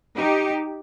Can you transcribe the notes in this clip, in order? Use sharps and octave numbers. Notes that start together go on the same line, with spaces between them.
D#4 G4